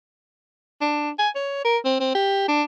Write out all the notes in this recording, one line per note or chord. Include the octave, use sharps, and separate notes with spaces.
D4
G#5
C#5
A#4
C4
C4
G4
D4